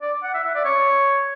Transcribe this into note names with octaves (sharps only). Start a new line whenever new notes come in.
D5
F#5
E5
E5
D5
C#5